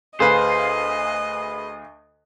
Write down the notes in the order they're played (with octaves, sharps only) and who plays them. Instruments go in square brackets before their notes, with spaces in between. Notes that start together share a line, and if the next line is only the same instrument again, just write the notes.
[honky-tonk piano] D2 F5 [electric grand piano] G#4 B4 [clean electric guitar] C5 [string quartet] D#5